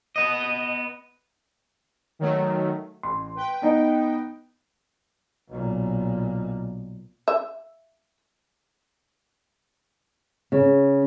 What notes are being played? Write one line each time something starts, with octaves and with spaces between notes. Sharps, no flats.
B3 D#5
D#3 F#3 A3
A1 C6
B4 G5
B3 D#4
B1 A#2
E5
C#3